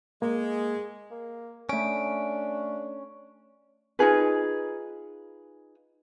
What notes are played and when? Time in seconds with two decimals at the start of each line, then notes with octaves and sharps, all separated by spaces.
0.22 G#3 A#3
1.11 A#3
1.69 A3 C#4 D4 D7
3.99 D#4 F4 G#4 B4